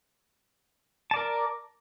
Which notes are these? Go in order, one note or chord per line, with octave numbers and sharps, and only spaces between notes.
A#4 D5 A5